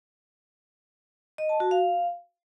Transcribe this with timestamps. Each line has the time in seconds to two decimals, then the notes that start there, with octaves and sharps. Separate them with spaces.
1.38 D#5
1.49 A5
1.60 F#4
1.71 F5